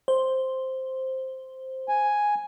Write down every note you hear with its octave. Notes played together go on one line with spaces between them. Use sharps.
C5
G#5